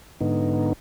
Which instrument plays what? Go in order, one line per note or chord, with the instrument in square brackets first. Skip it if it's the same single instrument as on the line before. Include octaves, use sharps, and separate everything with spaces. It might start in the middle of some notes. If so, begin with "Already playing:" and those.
[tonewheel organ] G#2 D3 B3 D#4